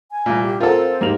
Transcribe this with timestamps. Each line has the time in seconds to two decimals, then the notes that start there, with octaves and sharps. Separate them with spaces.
0.11 G#5
0.26 C2 A#2
0.42 G4
0.60 C4 F4 A4 A#4 F#5 A#5
1.01 G#2 A#3 G4 F7